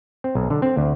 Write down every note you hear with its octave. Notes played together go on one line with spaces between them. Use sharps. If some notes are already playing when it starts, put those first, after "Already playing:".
C4
B1
D3
C4
D2